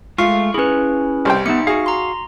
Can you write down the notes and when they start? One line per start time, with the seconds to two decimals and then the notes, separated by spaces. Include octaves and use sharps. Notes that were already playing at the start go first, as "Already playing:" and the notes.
0.18 G#3 A3 F4 F5 C#6
0.54 C#4 E4 G#4 B4
1.25 C2 C5 G5
1.46 A#3 B3 D#4 E5 C#7
1.67 F#4 G#4 F5
1.86 A#5 C6